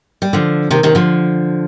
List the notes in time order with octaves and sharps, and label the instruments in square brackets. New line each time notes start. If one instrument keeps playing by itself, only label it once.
[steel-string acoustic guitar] G3
D3 F3
C3 D#3
C3 D#3
D3 F3